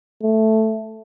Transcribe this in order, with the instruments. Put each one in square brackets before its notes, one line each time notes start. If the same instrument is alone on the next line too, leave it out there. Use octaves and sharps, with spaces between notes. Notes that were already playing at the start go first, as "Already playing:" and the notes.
[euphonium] A3